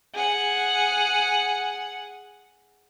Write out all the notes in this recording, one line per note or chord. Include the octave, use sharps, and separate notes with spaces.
G#4 F#5